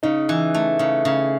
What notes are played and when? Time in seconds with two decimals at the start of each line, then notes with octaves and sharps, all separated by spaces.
0.03 C#3 D#4
0.29 E3
0.54 A3
0.79 C#3
1.05 C#3